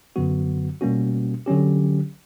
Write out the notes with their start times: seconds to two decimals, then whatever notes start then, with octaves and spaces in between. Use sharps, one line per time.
0.16 F#2 D3 F#3 B3 F#4
0.81 B2 G3 A#3 C#4 F#4
1.46 D3 F#3 C#4 G4